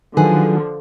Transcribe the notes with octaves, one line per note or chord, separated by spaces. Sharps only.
D3 D#3 F3 F#3 G#4 B4 F#5